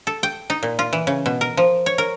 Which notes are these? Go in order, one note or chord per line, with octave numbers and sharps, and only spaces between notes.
A4
G5
D#4
A#2
F4
E3
C#3
B2
A#4
F3
C#5
A#4